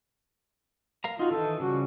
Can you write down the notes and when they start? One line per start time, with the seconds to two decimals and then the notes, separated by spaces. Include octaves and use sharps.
1.04 A#4 F5 A#5
1.19 D#4 F4 F#4
1.31 D#3 E3 D#4 A4
1.60 C#3 F3 G3 F#4